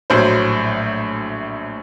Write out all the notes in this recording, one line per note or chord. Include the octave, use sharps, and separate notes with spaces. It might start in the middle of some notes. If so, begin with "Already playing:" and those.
A#1 A2 F#3 C5